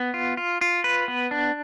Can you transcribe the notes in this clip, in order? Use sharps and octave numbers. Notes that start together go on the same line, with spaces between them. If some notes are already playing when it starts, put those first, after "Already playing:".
Already playing: B3
F4
F4
F4
B4
B3
D4